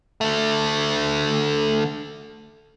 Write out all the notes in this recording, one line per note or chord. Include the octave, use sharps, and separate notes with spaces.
D3 A3